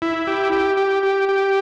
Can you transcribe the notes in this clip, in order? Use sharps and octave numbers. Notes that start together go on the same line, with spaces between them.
E4
G4
G4
G4
G4
G4